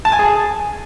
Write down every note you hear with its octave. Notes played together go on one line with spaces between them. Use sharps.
A5
G#5
G#4